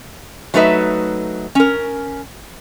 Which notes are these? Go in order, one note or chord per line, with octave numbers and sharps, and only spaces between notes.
F#3 A3 D#4 B4 E5
C#4 A#4